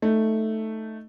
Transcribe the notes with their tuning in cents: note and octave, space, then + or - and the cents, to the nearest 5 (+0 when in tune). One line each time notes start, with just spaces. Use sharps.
A3 +0 D#4 +0